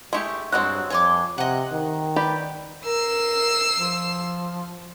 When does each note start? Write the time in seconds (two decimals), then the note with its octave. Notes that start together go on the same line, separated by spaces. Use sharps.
0.13 G#3 A3 E4 G4 C#6
0.52 G2 F#3 G#3 C4 F#4 F#6
0.90 F2 C#5 G#5 C6 D6
1.38 C3 D#5 F#5
1.73 D#3
2.16 G4 B4 D5
2.86 A#4 E6 C7
3.78 F3